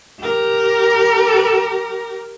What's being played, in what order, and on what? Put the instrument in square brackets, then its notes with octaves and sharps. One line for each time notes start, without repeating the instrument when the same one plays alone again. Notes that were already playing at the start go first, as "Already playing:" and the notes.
[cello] G4 A#4